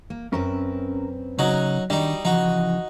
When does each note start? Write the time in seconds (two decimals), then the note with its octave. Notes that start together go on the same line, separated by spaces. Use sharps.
0.10 A#3
0.33 F#2 C4 C#4 A#4 B4
1.39 C#3 F#3 D#4 F#4
1.90 D#3 G3 D4 D#4 F#4 D#5
2.25 C#3 E3 F3 D#4 F#4